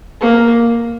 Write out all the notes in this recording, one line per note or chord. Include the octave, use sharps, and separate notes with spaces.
A#3